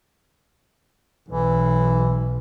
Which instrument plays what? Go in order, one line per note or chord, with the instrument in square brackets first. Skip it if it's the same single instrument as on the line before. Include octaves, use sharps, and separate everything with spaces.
[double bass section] B1 [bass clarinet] E3